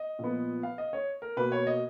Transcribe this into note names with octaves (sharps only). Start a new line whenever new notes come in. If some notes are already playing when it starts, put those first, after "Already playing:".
Already playing: D#5
A#2 F3 B3
F5
D#5
C#5
A#4
B2 A#3 B4
C#5
D#5